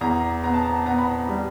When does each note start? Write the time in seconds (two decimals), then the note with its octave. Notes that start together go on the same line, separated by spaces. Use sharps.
0.01 E2 A#5
0.44 B3 A#5
0.54 A5
0.62 A#5
0.86 B3 A#5
0.98 B5
1.09 A#5
1.29 G3